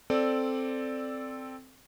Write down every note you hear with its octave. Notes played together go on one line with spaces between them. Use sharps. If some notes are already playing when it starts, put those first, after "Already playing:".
C4 A4 D5